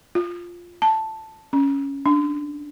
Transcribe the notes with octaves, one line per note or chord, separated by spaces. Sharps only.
F4
A5
C#4
D4